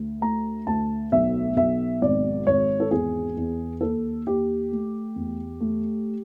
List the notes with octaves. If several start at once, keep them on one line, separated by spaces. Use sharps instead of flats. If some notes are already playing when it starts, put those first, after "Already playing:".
Already playing: D2
A3 A#5
D2 A5
B1 E5
B1 E5
G#1 D5
G#1 C#5
A4
E2 G#4
E2
D#2 A4
D#2 G4
A3
E2
A3